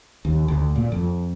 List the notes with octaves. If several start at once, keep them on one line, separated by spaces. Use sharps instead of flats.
D#2
D2
A#2
F2